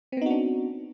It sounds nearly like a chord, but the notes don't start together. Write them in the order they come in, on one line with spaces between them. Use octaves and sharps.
C4 B3 D#4 F#4 D4